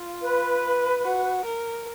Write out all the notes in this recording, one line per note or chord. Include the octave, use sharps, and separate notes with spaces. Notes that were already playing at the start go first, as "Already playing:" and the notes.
Already playing: F4
B4
F#4
A#4